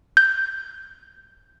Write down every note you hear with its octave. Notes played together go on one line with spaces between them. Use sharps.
G6